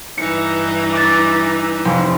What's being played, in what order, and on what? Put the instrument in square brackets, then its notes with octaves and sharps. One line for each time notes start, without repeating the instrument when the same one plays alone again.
[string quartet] G2 E3 D#4 [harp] C#7
[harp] D6 A6
F1